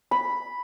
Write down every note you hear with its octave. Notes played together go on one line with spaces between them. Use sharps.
B5